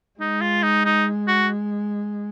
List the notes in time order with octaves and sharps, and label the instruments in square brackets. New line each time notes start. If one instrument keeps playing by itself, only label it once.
[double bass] G#3 [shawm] D#4
[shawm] F4
D#4
D#4
F#4